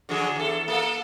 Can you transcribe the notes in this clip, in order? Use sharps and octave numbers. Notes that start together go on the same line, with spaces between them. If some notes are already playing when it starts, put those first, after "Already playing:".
D3 F3 G#4
E2 A4
A#3 A4